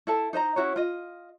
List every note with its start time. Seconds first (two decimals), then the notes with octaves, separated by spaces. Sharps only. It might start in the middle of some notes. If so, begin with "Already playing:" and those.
0.07 E4 A4 A5
0.33 D#4 C5 D#5 A#5
0.56 C#4 E4 F#4 C#5
0.76 F4 D#5